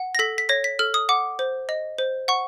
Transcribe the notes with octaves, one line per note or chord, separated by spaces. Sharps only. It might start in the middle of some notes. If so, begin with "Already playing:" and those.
Already playing: F#5
A#6
A4 B6
B6
C#5 A#6
B6
A4 F6
D#6
F#5 D6
C5
D#5
C5
F#5 C#6